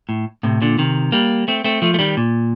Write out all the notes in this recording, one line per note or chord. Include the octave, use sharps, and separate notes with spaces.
A2
A2 C3
A#2 D3
C3 D#3
G3 A#3
A3 C4
A3 C4
F3 A3
A3
D#3 G3
A#2